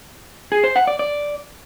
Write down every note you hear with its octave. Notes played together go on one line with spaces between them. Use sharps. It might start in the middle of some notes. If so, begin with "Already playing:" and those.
G#4
C5
F#5
D5
D5